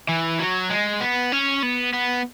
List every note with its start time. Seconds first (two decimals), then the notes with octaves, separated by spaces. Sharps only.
0.09 E3
0.39 F#3
0.70 G#3
1.01 B3
1.32 C#4
1.63 B3
1.93 B3